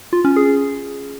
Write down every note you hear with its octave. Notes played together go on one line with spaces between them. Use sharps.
F4
C#4
G#4